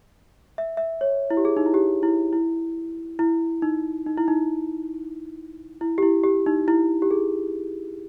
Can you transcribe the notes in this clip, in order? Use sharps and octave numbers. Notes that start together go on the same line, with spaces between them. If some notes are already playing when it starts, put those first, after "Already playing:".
E5
E5
C#5
E4
G4
G#4
D#4
E4
G4
E4
E4
E4
D#4
D#4
E4
D#4
E4
G4
E4
G4
D#4
E4
G4
G#4